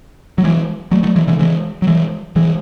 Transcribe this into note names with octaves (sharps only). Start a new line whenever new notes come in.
F#3
E3 G#3
F#3 A3
F#3 A3
E3 G#3
C#3 E3
E3 G#3
F#3
E3 G#3
E3 G#3